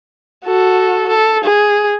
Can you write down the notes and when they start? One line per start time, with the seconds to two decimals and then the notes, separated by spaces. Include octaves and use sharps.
0.45 F#4 A4
1.08 A4
1.44 G#4